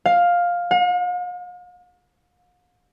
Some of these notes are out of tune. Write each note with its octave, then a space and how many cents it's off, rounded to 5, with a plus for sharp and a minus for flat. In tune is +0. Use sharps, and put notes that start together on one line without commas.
F5 +10
F5 +45